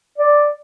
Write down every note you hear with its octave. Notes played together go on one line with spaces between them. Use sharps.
D5